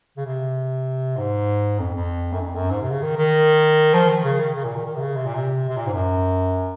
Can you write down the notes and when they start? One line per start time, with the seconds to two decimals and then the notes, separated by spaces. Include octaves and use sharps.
0.17 C#3
0.26 C3
1.17 G#2
1.79 F2
1.94 F2
2.33 F#2
2.40 F2
2.55 F#2
2.71 G#2
2.81 C3
2.91 C#3
3.02 D#3
3.17 D#3
3.94 F3
4.09 D#3
4.24 C#3
4.40 D#3
4.55 C#3
4.65 A#2
4.75 D#3
4.85 D#3
4.96 C3
5.00 C#3
5.16 C3
5.26 A#2
5.35 C3
5.69 C3
5.77 A#2
5.87 G#2
5.93 F#2